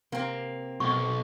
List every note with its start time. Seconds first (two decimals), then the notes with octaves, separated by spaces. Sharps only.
0.12 C3 A#3 C4
0.80 B1 C#6